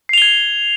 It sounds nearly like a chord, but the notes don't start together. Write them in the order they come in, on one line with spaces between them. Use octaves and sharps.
C7 F7 G7 G#6